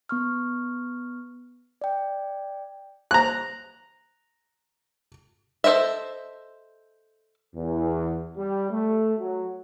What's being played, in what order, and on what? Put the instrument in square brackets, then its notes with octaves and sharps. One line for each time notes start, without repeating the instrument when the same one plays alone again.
[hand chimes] B3 C#6 F6
D5 G5
[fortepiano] A#5 F#6
[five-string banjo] A4 A#4 C5 D#5 E5
[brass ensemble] E2
G3
A3
F#3